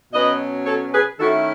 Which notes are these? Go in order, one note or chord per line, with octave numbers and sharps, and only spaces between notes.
B2 F#3 C#4 B4 D#5
A4 C#5
G#4 B4
D#3 A3 C#4 E4 F#4 A4